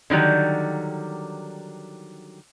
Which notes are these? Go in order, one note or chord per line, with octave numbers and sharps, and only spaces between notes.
D3 D#3 F#3 G3